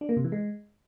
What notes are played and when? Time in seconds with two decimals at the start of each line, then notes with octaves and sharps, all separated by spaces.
0.01 D4
0.09 A#3
0.17 C3
0.24 E3
0.32 G#3